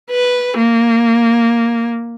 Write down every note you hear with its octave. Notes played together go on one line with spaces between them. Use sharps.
B4
A#3